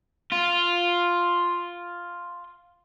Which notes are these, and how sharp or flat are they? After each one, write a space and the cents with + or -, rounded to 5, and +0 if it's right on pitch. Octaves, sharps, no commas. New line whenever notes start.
F4 +0